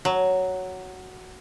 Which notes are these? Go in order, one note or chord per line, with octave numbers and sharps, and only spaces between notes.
F#3